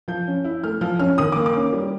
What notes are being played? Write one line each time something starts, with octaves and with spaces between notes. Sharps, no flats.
F3 G6
C#4
E4
A3 F6
F3 F6
C#4 F6
D#3 D#6
A#3 D6
D6
C#4
G3